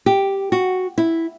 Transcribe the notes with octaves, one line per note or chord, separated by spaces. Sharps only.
G4
F#4
E4